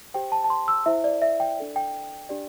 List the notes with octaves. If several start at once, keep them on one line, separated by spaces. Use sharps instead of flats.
G4 C5 G5
A5
A5
C6
E6
E4 C5 E5
D5
E5
G5
D4 A4 D5
G5
D4 G4 D5